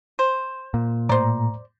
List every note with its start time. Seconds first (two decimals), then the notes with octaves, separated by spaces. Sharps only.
0.19 C5
0.74 A#2
1.09 A2 C5 D5 A#5